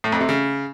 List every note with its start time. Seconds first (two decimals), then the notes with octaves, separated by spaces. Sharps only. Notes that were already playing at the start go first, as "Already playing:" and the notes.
0.04 A2
0.12 F2
0.20 C3
0.29 C#3